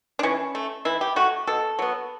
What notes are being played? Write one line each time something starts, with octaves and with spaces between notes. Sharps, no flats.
D4
E3 C#4
A3
E3 E4
G4
A3 F#4
B2 A4
F#3 B3